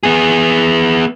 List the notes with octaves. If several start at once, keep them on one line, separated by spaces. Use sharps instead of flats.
B3 G#4